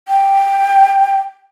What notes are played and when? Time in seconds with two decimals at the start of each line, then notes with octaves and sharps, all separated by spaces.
0.08 G5